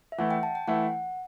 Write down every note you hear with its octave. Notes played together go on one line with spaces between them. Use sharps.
E5
E3 A3 E4 F#5
G5
A5
G5
E3 A3 E4 F#5